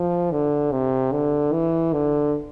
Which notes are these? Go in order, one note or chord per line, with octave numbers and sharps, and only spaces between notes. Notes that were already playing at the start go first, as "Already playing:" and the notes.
Already playing: F3
D3
C3
D3
E3
D3